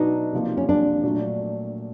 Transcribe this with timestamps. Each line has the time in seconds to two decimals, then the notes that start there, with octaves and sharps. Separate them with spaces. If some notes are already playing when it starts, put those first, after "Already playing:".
Already playing: B2 F#3 B3 D4 D#4
0.33 C3 F3 A#3
0.57 C#4
0.69 D4
1.03 A#2 F#3 A3